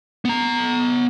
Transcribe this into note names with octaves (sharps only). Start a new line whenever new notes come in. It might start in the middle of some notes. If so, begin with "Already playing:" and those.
B3 A#5